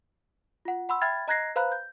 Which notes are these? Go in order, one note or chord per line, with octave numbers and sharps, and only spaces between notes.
F4 F#5
F#5 B5 C6 E6
E5 G5 B5 F6 G#6 A6
D#5 A#5 F#6 G#6 A#6 C7
B4 C5 F5 A#5 B5 F#6
G6